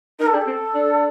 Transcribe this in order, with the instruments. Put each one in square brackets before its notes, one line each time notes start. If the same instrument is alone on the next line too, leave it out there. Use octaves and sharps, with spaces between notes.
[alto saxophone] D#4 [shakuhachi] A#4
[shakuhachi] A4
[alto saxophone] D4 [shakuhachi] G4
[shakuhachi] A4
[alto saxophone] C4
D4